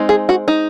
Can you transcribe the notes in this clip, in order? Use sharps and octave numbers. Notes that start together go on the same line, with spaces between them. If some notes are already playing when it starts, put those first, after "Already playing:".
Already playing: G#3 C4 D#4
G#4
F#4
D#4